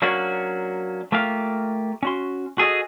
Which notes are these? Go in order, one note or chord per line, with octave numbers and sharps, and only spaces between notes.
F#3 A#3 C#4 D4 F#4
A3 A#3 F4 G4 F5
C#4 F#4 C6
F#4 G#4 A4 D#5